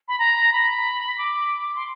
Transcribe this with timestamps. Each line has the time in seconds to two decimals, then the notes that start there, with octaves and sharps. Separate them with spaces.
0.08 B5
0.19 A#5
0.53 B5
1.18 D6
1.75 C6